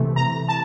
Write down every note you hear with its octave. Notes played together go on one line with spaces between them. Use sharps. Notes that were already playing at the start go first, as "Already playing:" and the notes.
Already playing: C3 E3 A3
A#5
A5